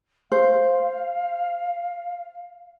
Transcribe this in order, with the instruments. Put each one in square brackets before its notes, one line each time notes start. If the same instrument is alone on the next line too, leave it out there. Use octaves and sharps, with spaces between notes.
[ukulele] C5 [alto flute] F5